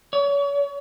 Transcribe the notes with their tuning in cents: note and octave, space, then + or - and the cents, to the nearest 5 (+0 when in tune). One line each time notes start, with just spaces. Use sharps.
C#5 +35